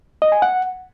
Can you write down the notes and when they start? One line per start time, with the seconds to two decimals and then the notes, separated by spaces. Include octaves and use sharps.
0.22 D#5
0.32 G#5
0.42 F#5